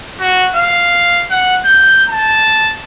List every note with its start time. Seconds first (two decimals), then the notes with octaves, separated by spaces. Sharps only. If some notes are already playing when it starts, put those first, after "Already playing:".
0.21 F#4
0.56 F5
1.31 F#5
1.65 G6
2.09 A5